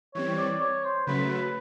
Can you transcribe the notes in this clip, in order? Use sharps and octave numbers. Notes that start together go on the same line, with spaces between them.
E3 G3 C4 C#5
D5
C#5
C5
C#3 F#3 A3 B4
B4